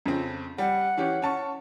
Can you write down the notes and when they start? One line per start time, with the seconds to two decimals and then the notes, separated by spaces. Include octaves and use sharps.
0.06 F2 C#3 C4
0.58 G3 F#5
0.97 E3 C#4 G4
1.22 C#4 A5 C#6